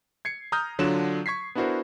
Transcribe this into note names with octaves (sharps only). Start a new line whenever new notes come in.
G#6 C7 C#7
A#5 D#6 F6 G6
D3 F#3 D4 F4 D5 E7
C#6 G#6 B6 C7
B3 D4 E4 F#4 A#4 C5